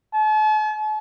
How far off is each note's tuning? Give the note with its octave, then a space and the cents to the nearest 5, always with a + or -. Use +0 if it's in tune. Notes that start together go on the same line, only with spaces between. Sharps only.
A5 -45